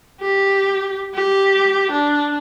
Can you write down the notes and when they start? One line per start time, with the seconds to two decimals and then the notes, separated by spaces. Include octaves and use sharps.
0.21 G4
1.14 G4
1.91 D4